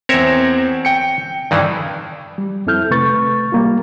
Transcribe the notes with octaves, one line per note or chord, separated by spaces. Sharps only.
E2 C4 A#4 C#5 E5
G5 C#7
G2 D#3 E3
G3
F2 C4 E4 A4 F6 G6
C3 A3 B4 C#6 A6
G3 A#3 F4